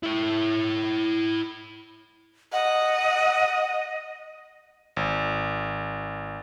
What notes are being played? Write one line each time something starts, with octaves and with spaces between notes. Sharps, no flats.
E4 C#5
D#5 F#5
G#1